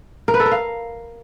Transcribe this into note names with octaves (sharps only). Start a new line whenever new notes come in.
A#4
B4
A4
A#4
F5